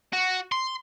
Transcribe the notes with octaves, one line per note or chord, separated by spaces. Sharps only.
F#4
C6